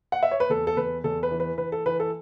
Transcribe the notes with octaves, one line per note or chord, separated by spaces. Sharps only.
F#5
E5
C#5
B4
E2 A4
A4
E2 B4
E2 A4
B4
E3
B4
E3 B4
A4
E3 B4
A4